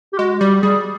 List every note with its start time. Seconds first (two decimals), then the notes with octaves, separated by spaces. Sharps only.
0.13 G4
0.18 G#3 F#4
0.40 G3 G4
0.62 G3 G#4